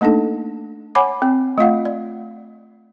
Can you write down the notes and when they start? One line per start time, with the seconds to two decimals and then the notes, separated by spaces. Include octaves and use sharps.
0.01 A3 A#3 D4 D#4 A4
0.95 C#5 F#5 G#5 B5 D6
1.22 C4
1.58 A3 F4 F5 F#5
1.85 D5